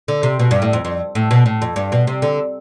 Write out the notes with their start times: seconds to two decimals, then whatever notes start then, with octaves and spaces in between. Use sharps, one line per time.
0.08 D3
0.23 C3
0.39 B2
0.51 G2
0.62 A2
0.73 F2
0.85 F2
1.15 A2
1.31 B2
1.46 A2
1.62 F2
1.76 G2
1.92 B2
2.07 C3
2.22 D3